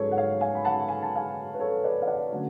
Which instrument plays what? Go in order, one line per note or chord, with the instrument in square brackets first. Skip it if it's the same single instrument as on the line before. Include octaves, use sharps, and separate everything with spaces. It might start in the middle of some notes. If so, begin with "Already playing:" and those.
Already playing: [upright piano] G#2 F#3 C#4 G#4 A4 B4 C#5
F#5
C#5 F5
F5 G#5
B5
F#5 A5
G#5
A5
F5 G#5
B4
A4 C#5
B4 D5
F5
D5 F#5
D3 F#3 A3 C#4